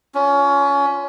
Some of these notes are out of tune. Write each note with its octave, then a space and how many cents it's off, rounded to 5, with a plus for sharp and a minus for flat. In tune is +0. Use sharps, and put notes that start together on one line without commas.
C#4 +25 F4 +5